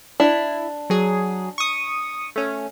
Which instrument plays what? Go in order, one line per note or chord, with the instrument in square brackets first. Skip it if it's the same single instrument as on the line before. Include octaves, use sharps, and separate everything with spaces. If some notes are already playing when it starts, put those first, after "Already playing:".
[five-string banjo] D4 [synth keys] E4
[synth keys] F#3 G#4
C#6 D#6
A3 C#4